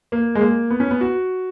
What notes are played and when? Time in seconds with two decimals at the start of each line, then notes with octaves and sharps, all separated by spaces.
0.12 A#3
0.35 G#3
0.41 A#3
0.71 B3
0.80 C#4
0.91 B3
1.01 F#4